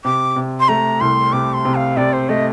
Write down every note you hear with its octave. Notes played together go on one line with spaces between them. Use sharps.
C3 D6
C3
C6
A3 A#5
C2 C6
C3 D6
C6
C3
F5
C3 D5
C5
A3 D#5